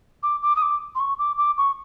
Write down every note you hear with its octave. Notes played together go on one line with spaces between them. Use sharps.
D6
D6
D#6
D6
C6
C#6
D6
D6
C#6